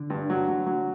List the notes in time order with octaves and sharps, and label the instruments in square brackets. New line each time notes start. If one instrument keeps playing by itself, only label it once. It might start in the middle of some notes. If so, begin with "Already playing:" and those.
Already playing: [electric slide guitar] D3
[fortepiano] G2
F#3
F#3
F#3